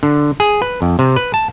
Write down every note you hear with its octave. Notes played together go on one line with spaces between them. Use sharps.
D3
G#4
B4
F2
C3
B4
A5